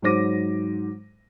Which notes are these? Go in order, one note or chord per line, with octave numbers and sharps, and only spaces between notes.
G#2 F#3 C5 D6 A#6 D#7